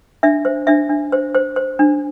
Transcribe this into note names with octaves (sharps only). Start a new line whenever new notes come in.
D4 E5
C5
D4 E5
D4
C5
C5
C5
D4